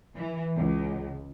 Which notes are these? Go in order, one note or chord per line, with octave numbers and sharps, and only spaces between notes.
E3
C#2